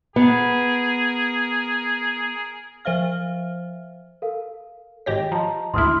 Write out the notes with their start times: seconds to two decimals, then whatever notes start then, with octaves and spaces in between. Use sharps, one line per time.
0.16 B3 G#4 A#4
2.85 F3 C5 E5 F5 F6
4.22 A4 A#4 F5
5.06 G#1 G4 C#5 D#5 G5 A#6
5.32 F3 D#5 A5 A#5
5.74 G#1 D2 E4 C6 D#6 F6